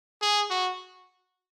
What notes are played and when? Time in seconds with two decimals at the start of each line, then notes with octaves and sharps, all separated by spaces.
0.22 G#4
0.50 F#4